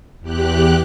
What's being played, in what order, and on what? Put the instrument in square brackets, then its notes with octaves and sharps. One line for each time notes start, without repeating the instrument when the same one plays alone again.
[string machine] E2 G4 F#6